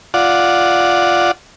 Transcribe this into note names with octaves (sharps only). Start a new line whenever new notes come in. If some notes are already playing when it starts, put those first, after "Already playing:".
F4 D5 F#5